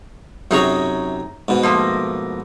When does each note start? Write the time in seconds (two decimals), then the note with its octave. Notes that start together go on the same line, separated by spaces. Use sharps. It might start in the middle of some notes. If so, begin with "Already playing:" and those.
0.51 F#2 C3 D#4 G#4 C#5 A#5
1.48 G#2 B2
1.63 F3 A3 A#3